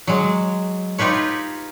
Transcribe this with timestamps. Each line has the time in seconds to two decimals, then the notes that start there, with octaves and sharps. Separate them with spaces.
0.07 F#3 G#3
0.98 D#4 F4 G4 B4 C#5